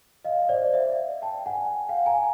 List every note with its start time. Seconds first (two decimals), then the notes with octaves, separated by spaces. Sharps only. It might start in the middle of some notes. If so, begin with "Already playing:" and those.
0.25 D#5 F5
0.49 C5 D5
0.73 D5 E5
1.22 G5 A5
1.46 F#5 G#5
1.89 F5 G5
2.06 G#5 A#5